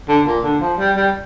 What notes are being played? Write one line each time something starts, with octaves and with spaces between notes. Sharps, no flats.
D3
A#2
D3
F3
G3
G3